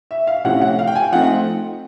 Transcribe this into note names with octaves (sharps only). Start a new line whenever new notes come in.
E5
F5
C3 F3 A3 C#4 E4 F#5
F#5
F5
G5
G#5
G5
F3 A3 C4 D#4 F#5